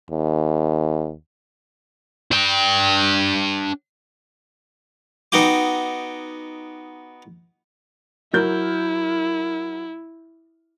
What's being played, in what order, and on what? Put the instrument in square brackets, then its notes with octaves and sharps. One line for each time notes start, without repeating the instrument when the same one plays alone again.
[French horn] D#2
[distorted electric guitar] D4 G5
[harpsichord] B3 D#4 F#4 G5 D6
[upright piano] F#3 A#4 G6 [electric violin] E4